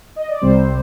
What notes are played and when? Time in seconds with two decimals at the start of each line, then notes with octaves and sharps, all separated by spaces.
0.16 D#5
0.29 D5
0.41 C2 C3 G3 C4 C5